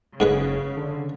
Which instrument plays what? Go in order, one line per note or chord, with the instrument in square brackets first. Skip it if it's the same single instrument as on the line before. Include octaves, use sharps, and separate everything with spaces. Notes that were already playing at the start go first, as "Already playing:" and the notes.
[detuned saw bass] F#1 [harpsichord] G#2 G#4 B4 [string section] C#3
[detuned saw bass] D3